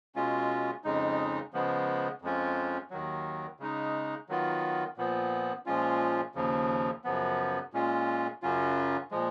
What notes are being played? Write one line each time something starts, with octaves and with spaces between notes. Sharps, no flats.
B2 G#3 C#4 F4
F2 C#3 G#3 D#4
C#3 F3 G#3 B3
F2 F3 G#3 C#4 F4
D#2 D#3 F#3
C#3 G#3 D#4
D#3 F#3 B3 F4
A#2 F3 B3
A#2 F3 G#3 C#4 F4
D#2 C#3 F3
F#2 C#3 F3 B3
A#2 G#3 C#4 F4
F#2 C#3 F#3 C#4 F4
A#2 F3 G#3